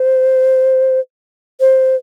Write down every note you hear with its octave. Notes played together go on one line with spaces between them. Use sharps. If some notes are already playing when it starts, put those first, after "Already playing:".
Already playing: C5
C5